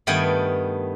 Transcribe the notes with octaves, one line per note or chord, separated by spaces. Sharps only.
G2 D#3 A3 B3 G5 G#5